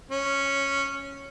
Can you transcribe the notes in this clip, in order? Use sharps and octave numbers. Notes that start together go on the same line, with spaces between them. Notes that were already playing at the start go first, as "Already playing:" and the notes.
C#4